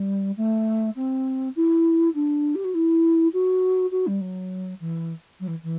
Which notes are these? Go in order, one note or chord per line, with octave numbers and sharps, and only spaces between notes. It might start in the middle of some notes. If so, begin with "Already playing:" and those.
Already playing: G3
A3
C4
E4
D4
G4
F#4
E4
F#4
F#4
G3
F#3
E3
F#3
E3
E3